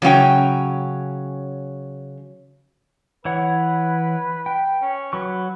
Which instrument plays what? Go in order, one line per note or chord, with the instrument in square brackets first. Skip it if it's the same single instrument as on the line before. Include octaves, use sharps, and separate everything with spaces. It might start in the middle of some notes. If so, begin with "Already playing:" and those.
[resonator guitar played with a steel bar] C#3 F#3 C#4 G5
[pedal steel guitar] E3 C#5 F#5 [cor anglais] B4
[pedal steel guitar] G5
[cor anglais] C#4
[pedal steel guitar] F#3 C#6 [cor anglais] B4